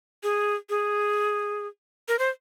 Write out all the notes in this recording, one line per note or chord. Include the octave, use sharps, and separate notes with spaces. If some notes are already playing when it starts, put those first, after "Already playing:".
G#4
G#4
A#4
C5